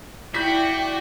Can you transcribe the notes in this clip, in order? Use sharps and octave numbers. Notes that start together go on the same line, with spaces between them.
E4 F#4 D5 G5 G6 B6